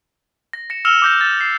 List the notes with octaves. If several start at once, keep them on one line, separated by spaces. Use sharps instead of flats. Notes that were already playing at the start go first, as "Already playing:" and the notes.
A#6
A#6 C#7 E7
E6 F6 C#7 E7 F7 G7
D6 G6 A#6
A6
C7